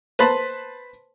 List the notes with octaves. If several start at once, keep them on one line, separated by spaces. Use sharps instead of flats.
B4 C5 A5 B5